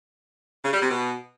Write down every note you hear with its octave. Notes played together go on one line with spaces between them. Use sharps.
C#3
G3
C3
B2